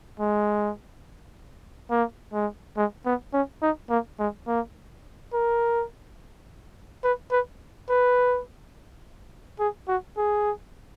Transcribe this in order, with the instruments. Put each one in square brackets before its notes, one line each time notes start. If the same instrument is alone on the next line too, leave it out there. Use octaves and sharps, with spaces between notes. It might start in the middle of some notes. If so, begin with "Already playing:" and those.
[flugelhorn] G#3
A#3
G#3
G#3
B3
C#4
D#4
A#3
G#3
A#3
A#4
B4
B4
B4
G#4
F#4
G#4